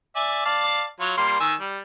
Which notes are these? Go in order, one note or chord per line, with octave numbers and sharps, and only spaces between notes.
D5 E5 G#5
D5 F5 A5
F#3 F4 C#5
G3 A#3 C6
D#3 G#5 E6
G3